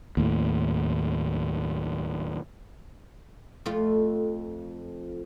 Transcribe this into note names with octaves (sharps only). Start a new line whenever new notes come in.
D#2 A2
F2 A3 F4